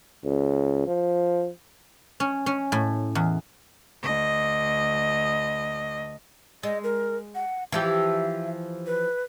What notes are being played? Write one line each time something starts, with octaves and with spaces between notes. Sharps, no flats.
C#2
F3
C#4
C#4
A2
E2
D2 D#5
G#3 D#5
A#4
F#5
E3 F3 G4 E5
B4